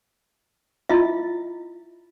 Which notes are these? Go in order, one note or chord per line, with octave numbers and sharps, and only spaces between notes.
E4 F4 D#5 E5